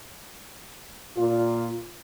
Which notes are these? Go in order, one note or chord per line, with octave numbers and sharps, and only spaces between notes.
A#2 F4